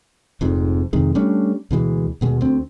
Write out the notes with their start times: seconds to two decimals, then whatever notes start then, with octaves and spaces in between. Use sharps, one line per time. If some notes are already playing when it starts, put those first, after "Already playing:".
0.41 F1 F2 G#2
0.93 F2 C3 D#3 G#3
1.15 G3 A3 C#4 D4
1.71 D2 B2 E3 G#3
2.21 D#1 B2 G#3
2.41 D2 C4